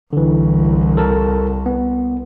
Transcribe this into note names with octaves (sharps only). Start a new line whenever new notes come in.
C2 D3 E3
A4 A#4 A5
B3